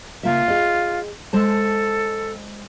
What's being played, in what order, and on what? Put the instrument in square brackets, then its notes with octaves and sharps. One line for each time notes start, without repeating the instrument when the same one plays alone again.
[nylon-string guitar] C#3 A#3 E5 [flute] F4
[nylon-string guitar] G#4 D#5
[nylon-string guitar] G#3 C5 A5 [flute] A4